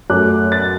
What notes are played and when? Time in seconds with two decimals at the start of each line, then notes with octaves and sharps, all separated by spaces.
0.10 F#2 F#3 A3 D6 F#6
0.52 F#6 A6